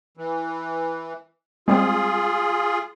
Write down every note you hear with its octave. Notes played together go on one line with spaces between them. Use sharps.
E3
G3 G#3 C4 F4 G#4